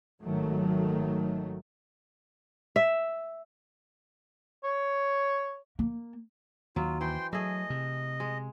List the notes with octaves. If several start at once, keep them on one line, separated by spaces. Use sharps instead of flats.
G#1 D#3 F#3 A3
E5
C#5
A#3
D#2 F#3 F4
E3 C5 G5 C6
F#3 A3 G#4 D#5
C3
G#3